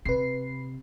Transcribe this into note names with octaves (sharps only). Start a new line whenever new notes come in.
C3 B4 C7